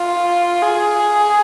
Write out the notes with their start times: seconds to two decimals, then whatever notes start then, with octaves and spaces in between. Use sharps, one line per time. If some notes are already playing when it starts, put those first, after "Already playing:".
Already playing: F4
0.62 G#4